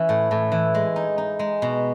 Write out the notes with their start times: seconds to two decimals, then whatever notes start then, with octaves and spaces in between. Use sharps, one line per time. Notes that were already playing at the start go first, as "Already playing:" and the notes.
Already playing: E3 C#4
0.09 A2
0.31 A2
0.52 E3
0.75 G#3
0.96 D#4
1.18 D#4
1.39 G#3
1.62 B2